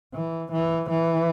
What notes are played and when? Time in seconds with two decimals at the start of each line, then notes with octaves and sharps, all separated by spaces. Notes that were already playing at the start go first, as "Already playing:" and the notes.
0.14 E3
0.52 E3
0.90 E3